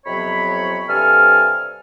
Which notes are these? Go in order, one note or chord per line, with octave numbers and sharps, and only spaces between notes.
F2 C3 F#3 B3 C#5 B5
G2 C3 A4 G#5 F6